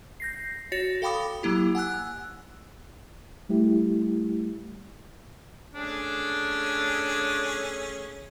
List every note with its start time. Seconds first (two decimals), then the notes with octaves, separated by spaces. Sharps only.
0.20 G6 A#6 C7
0.72 F#4 C#5 A6 A#6 C#7
1.02 A4 F5 G5 B5 D6 D#6
1.43 F#3 A#3 E4 G4
1.75 F#5 G#5 E6 F#6
3.49 G3 A3 E4 G4
5.75 A3 C#4 D4 G#4